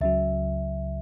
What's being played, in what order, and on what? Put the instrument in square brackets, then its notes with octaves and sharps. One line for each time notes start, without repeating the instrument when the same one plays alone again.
[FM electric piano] C#2 C#3 F#3 [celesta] E5